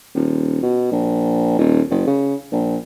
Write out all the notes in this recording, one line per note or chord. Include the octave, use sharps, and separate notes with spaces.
D#1
B2
A#1
D#1
F#1
C#3
A#1